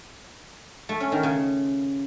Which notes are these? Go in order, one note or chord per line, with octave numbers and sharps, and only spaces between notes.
A3
C#4
D#3
C#3